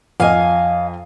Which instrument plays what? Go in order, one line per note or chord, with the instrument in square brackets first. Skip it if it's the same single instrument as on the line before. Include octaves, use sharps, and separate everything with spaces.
[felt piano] F2 D#5 [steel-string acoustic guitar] F5 G#5